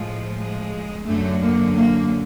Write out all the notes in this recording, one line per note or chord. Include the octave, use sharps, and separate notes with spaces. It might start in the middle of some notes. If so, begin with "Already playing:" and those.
Already playing: A2 F3 G#3
G#3
F#2 D3 F#3 A3
A#3
A#3